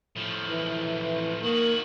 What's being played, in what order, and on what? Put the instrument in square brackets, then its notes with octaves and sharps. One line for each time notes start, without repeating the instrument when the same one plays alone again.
[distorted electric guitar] A2 F3
[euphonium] E3
[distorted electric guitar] D#3 F#4 [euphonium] A#3